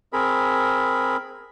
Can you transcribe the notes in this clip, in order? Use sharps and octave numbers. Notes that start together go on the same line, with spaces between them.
C4 G#4 A#4 B5